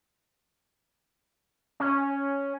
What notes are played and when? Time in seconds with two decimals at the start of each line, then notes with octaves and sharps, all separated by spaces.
1.80 C#4